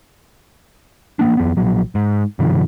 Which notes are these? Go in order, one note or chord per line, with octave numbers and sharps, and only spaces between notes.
A1 A#3 D4
F2 B3
A#1 F#3
G#2
G2 C3 D#3 F3